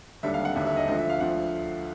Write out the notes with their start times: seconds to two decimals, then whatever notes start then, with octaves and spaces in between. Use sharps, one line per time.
0.23 E1 D#2 D3 G3 E5
0.34 F5
0.45 F#5
0.55 E1 D#2 D3 G3 E5
0.66 E5
0.76 D#5
0.88 D2 D3 F3 D#5
0.98 E5
1.10 F5
1.20 D2 D3 F3 F#5